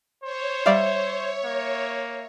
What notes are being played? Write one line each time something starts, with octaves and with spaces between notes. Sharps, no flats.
C5 C#5
G3 D5 E5 F5
A#3